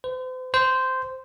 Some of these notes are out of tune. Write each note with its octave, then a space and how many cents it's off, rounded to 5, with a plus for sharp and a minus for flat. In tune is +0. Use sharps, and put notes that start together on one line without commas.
C5 -40
C5 -10